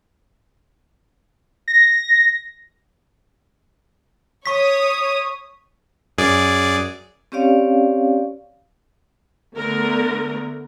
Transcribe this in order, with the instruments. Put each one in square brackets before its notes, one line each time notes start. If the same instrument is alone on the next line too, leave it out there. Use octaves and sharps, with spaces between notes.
[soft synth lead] A#6
[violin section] C#5 D#6 [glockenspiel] C#6 B6
[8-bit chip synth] F#2 G#4 D5
[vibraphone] C4 C#4 G4 C#5 D5 F5
[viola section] D3 A3 B3 A#4